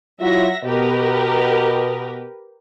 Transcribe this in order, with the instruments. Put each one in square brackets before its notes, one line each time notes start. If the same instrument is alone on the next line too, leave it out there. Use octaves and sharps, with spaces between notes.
[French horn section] F#3 E4 F4 [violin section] E5 F#5 A#6
[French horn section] B2 [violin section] G4 A#4 B4